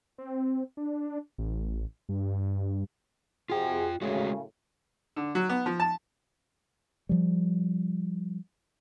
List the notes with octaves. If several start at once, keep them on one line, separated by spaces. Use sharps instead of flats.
C4
D4
A1
G2
C3 F4 F#4 G#4 G5
F#2 A2 C#3 G#3 A3 F#4
D3
F#3
B3
F3
A5
F3 G3